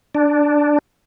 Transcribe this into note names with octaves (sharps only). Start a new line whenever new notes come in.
D4